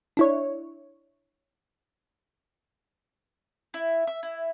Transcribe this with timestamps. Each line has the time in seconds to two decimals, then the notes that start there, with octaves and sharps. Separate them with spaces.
0.17 D4 E4 C#5
3.74 E4
4.07 E5
4.23 E4